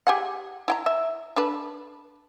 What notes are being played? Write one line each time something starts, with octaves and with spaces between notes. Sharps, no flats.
G4 G#4 F#5
E4 G5 A#5
E5
D4 A4 B4